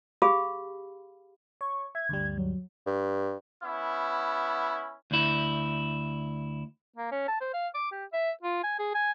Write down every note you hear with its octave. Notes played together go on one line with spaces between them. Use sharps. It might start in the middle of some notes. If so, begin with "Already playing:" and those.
G4 G#4 F5 B5 D#6
C#5 C#6
E5 G#6
D2 G2 G3
F#3
G2
B3 C#4 E4
D2 E4
A#3
C#4
A5
C5
F5
D6
G4
E5
F4
G#5
G#4
G#5